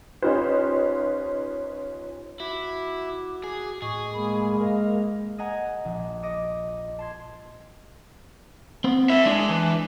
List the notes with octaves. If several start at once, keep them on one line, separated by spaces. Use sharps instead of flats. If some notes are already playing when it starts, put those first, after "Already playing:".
C#4 D#4 F4 G4 B4 C5
E4 F#4 D6
G#4
A2 G#4 D#5 C#6
G#3 A#3 B5
A#4 D#5 F5
D#5 F#5 G#5 A#5
A#1
D#5 D6 C#7
A5 C6 G#6
B3 C4
E4 A#4 E5
G#3 D4 E4 D5
E3